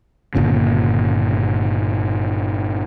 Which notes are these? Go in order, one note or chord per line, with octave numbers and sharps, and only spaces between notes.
G1 A#2 C#3